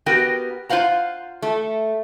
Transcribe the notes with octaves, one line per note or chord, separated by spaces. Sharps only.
B3 F#4 G4 A#4 G5
F4 C5 F5 F#5 A#5
A3